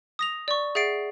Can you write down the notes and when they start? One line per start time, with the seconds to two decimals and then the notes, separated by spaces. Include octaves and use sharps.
0.19 D#6 A#6 F7
0.48 D5 C#6
0.75 G#4 E5 F#5 A6 C7 D7